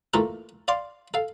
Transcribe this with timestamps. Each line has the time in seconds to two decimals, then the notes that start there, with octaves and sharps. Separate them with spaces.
0.14 E3 A3 A#3 F4 A4 A#4
0.68 D5 F5 C6
1.14 A4 F5